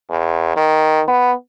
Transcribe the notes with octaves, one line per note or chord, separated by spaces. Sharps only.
E2
D#3
B3